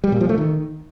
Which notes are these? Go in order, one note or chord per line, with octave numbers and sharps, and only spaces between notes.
G3
A#2
F3
A3
D#3